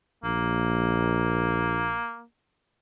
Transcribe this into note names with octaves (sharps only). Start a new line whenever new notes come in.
A#1 A#3